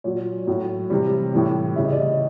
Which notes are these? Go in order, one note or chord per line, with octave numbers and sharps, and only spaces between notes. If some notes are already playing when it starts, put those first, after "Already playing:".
A#2 F#3 C#5
A2 F#3
C3 E3 G3
A2 E3 G3
C#3 E3 G3 E5
D#5
D5
D#5